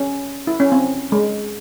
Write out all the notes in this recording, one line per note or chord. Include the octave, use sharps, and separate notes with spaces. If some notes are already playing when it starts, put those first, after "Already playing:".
Already playing: C#4
E4
C#4
C4
G#3